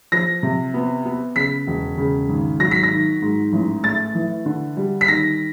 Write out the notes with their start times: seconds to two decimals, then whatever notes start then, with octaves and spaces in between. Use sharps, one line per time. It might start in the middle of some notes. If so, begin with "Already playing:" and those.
0.12 F3 A#6
0.43 C3
0.74 B3
1.05 B3
1.36 C#3 B6
1.67 E1
1.98 C#3
2.29 G#1
2.60 F#3 A#6
2.71 B6
2.83 A#6
2.91 D#3
3.22 G#2
3.53 A1
3.84 A3 A6
4.15 E3
4.46 D3
4.77 G3
5.01 B6
5.08 D#3 A#6